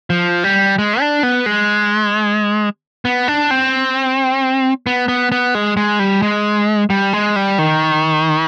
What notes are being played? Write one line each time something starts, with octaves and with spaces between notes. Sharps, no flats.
F3
G3
G#3
D4
B3
G#3
B3
D4
C4
B3
B3
B3
G#3
G#3
G3
G#3
G3
G#3
G3
D#3